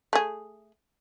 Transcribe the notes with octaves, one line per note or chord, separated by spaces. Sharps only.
A3 G#4